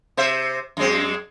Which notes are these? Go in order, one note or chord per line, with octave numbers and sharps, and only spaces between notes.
C3 C5 E5
F#2 G#3 C4